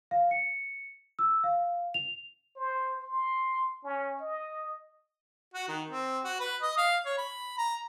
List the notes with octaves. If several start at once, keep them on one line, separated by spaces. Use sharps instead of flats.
F5
C#7
E6
F5
F7
C5
C6
C#4
D#5
F#4
D#3
C4
F#4
B4
D#5
F5
C#5
B5
A#5